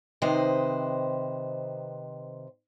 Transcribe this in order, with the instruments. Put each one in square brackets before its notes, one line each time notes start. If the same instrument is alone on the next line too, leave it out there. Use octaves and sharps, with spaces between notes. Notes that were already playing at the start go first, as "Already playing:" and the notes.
[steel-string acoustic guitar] C3 D#3 B4 C5 D#5